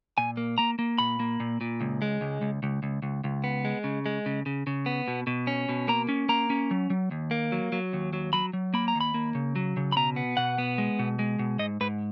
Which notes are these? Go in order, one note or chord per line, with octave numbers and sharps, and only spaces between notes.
A#2 G#5
A#3
A#3 A#5
A#3
A#2 B5
A#3
A#2
A#2
C#2
G#3
C#2
C#2
C#2
C#2
C#2
C#2
B3
G#3
C#3
G#3
C#3
C#3
C#3
B3
B2
B2
C#4
B2
A#3 A#5
C#4
A#3 A#5
C#4
F#3
F#3
D#2
A#3
F#3
F#3
D#2
F#3
F#3 B5
F#3
A#3 B5
A#5
D#2
B5
A#3
C#3
F#3
C#3
B5
B2 A#5
B3
B2 F#5
B3
G#3
B2
G#3
B2
G#2 D#5
G#2 B4